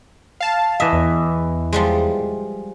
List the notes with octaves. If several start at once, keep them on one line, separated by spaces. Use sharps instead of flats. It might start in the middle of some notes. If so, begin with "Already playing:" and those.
F5 A5
E3 D#5 E5
E2
F3 G3 G#3